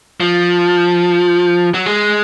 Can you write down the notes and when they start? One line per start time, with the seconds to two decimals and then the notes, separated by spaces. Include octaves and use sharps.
0.20 F3
1.74 F#3
1.86 G#3